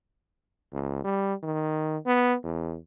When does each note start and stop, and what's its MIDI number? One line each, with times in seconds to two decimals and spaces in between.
0.72 1.01 37
1.04 1.34 55
1.43 1.98 51
2.06 2.35 59
2.44 2.76 40